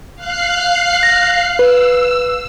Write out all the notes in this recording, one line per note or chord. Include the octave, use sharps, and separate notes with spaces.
F5 F#6 C7
A#6
B4 E6